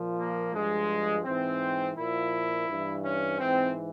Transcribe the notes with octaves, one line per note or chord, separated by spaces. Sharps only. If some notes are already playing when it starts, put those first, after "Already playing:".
Already playing: A#2 F3
A#3
G2 F3 G#3
G#2 E3 C4
A#2 F3 E4
G2 E3
C#4
G#2 E3 C4